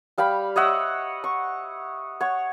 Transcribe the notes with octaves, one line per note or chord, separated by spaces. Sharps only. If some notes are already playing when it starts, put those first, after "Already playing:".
G3 F5 G5 B5
C#5 D#5 E5 F#5
C#6
C#5 F#5